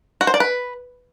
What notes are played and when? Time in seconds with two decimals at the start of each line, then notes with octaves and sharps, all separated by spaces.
0.21 F#4
0.27 C5
0.34 D5
0.40 B4